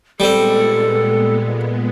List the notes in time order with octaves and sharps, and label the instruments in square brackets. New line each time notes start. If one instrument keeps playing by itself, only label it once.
[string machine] A#2 G#3 B3 [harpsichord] G3 C4 [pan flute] A4